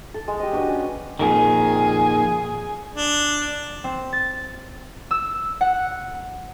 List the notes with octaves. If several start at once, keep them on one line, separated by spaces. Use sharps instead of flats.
A4
G#3
G4 D#5
D4 F#4 B4 D#5
C#4
F2 A#2 D#3 G#4
D4
C4
A6
E6
F#5